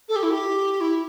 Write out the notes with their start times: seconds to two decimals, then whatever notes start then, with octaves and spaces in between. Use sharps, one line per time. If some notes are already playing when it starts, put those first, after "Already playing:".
0.08 A4
0.15 G4
0.22 E4
0.30 G4
0.80 E4